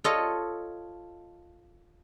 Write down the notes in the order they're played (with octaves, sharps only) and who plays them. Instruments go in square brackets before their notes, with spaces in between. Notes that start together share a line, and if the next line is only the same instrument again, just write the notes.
[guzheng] F4 A4 C#5 D#5